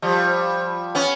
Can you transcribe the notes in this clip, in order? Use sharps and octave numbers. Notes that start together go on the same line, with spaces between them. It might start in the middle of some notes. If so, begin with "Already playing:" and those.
F3 G3
B3 C#4